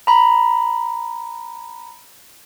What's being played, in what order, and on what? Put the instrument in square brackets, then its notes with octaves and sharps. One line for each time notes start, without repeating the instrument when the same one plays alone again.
[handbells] A#5 B5